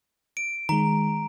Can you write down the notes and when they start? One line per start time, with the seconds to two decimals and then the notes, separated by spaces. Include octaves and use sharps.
0.37 D7
0.69 D#3 G#3 A#5